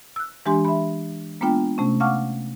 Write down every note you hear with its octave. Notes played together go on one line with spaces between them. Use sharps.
E6 F#6
E3 G#3 D4 G4 G#5 C6
E5 B5
G#3 A#3 B3 D4 F4 G5
C3 A3 C#4
F5 F#5 A5 C#6 D6 F6